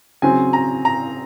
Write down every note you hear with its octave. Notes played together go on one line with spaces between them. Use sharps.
C#3 F#3 C4 G#5
A#5
A#5